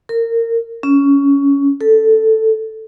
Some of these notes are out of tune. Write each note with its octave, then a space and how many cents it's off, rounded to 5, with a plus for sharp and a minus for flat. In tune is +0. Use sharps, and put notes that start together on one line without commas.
A#4 -25
C#4 +15
A4 +5